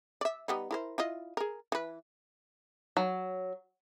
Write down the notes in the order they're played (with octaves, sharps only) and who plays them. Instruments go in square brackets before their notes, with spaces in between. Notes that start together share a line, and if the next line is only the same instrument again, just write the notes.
[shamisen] D5 E5
G3 B3 D#4
E4 A#4 C5
E4 F4 D#5
G#4 A#4
E3 B4
[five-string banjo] F#3